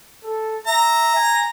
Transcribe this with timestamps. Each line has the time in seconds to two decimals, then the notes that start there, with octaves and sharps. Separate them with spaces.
0.24 A4
0.67 E5 A#5
1.16 G#5